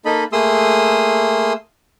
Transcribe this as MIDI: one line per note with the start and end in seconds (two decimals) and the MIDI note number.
0.05 0.24 58
0.05 0.24 63
0.05 0.24 69
0.05 0.24 75
0.05 0.24 83
0.32 1.53 57
0.32 1.53 58
0.32 1.53 68
0.32 1.53 84
0.32 1.53 87
0.32 1.53 88